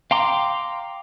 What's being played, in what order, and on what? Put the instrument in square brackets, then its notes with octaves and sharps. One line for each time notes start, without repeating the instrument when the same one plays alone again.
[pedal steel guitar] F5 G5 A#5 C6 D6